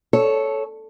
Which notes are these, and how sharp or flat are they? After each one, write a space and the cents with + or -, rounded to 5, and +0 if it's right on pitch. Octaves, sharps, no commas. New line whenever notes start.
A4 -10 C#5 +0